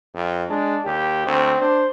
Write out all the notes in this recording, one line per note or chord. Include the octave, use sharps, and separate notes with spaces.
F2
G#3 D4
D#2 G4
D2 C4
D4 C5